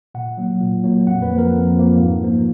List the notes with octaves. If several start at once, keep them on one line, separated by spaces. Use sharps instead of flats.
A#2 F#5
F#3 A#3
A#2
F#3 A#3
F2 F#5
B4
F3 A#3
A#4
F2
F3 A#3
G#2
F3 A#3